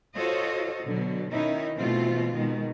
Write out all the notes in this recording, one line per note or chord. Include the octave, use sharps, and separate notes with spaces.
F4 F#4 A4 C5 C#5 D#5
B2 D3 F#3
B2 D#3 C#4 D#4 E4
B2 E3 A3 C4 F4
B2 D#3 G#3